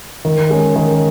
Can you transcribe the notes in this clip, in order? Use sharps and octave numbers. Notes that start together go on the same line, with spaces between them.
D#3
G#3 C#4
D#3